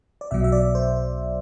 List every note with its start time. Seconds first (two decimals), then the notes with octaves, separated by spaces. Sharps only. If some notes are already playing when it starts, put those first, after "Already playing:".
0.21 D5
0.31 B1 B2 F#3 E5
0.44 E5
0.52 D5
0.75 C5